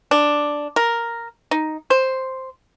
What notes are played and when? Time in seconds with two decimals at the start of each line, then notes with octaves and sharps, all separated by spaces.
0.11 D4
0.76 A#4
1.51 D#4
1.90 C5